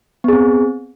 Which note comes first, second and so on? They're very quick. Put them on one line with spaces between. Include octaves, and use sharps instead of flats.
B3 G#4 C4